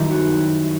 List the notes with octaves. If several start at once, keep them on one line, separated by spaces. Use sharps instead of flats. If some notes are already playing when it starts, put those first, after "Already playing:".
Already playing: F#2 D#3 G3 E4
F#4